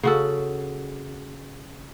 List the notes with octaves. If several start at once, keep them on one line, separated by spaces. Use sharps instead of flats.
C#3 F#4 A4